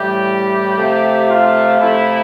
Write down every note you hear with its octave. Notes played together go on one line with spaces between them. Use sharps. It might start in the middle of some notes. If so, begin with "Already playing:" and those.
Already playing: A2 E3 G3 G4
C3 F3 A3
F4
C3 F3 A3 E4